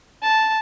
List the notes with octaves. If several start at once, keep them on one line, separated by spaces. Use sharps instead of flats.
A5